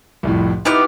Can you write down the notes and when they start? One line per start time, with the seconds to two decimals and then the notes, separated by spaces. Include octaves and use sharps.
0.23 C2 F2 A2
0.65 B3 D#4 E4 G4 B4 F6